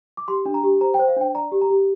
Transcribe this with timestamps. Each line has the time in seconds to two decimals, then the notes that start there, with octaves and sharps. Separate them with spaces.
0.17 D6
0.28 G4 C6
0.46 D4
0.54 A#5
0.63 G4
0.81 C5 A#5
0.94 G5
0.99 C5
1.08 F5
1.17 D4 G5
1.34 D5 A#5
1.52 G4
1.62 A#5
1.70 G4